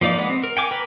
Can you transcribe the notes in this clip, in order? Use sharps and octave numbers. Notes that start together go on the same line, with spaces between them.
F3 A#3 D#4 D5 D6
G#3 B3
C4
A#4
G5 G#5 D6
A#4 B4